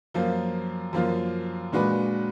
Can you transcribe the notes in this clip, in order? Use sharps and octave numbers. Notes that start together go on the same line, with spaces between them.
F#2 F3 A#3 F4
F#2 F3 A#3 F4
A#2 G#3 D4 F#4 B4